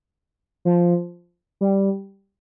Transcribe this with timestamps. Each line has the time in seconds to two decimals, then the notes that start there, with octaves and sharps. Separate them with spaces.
0.65 F3
1.61 G3